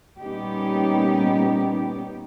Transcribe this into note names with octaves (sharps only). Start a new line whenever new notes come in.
A#2 G3 B3 C#4 D#4 G4